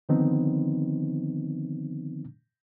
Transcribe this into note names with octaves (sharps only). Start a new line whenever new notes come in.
D3 D#3 F3 B3 C4 D#4